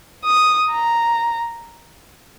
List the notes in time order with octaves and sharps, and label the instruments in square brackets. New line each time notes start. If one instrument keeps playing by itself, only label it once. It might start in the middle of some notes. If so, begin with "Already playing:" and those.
[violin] D#6
A#5